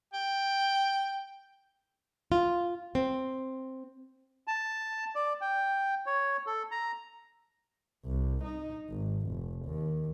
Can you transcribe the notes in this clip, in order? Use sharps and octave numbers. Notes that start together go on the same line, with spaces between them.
G5
F4
C4
A5
D5
G5
C#5
A4
A#5
C2
D#4
G#1
F1
D#2